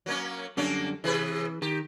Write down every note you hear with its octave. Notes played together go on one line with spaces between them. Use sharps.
F#3 A#3 C#4
F#2 D3 G3 A#3 C#4 D4
C3 E3 G#4 B4
D#3 G4